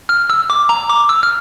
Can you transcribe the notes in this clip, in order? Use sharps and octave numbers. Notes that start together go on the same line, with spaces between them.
F6
E6
D6
A#5
D6
E6
F6